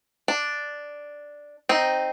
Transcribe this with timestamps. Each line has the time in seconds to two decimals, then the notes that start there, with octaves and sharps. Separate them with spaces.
0.28 D4
1.69 C4 D#4